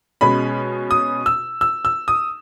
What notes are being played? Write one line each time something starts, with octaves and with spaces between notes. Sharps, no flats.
B2 G#3 C#4 B5
D#6
E6
E6
E6
D#6